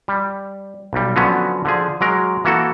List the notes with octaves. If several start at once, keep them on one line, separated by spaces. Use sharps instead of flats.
G3
B1 G3
D3 F3 F#3 B3 C#4
D3 F3 G#4
F#3 G#3 A#4
E3 A#3 F#4 A4